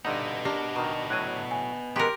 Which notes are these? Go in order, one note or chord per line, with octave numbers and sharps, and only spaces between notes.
G2 D3 B3 D#4 D#5
D4 G4 A#4
B2 D#3 A#5
A2 F#3 F#6 G#6 D#7
G#5
G#3 G4 A#4 B4 F#5 A#5 C6